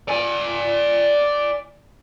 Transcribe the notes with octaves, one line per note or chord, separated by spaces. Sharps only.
D5 G#5